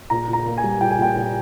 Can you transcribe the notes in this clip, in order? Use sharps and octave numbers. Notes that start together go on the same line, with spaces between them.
A#2 A#5
A#2
A#5
A#3
G#5
G3
A#2 G5
G#5
A#2 G5
A#2